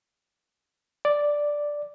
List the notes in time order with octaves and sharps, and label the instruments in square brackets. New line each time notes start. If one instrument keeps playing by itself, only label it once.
[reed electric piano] D5